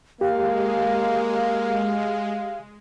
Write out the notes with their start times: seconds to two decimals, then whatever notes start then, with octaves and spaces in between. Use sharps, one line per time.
0.21 G#3 A#3 G4 F5